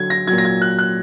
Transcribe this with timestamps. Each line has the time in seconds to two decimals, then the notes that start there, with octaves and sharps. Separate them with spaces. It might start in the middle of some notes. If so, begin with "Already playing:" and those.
Already playing: D3 F#3 G#6
0.10 A#6
0.27 A#2 F#3 G#6
0.38 A#6
0.45 G#6
0.62 F#6
0.79 F#6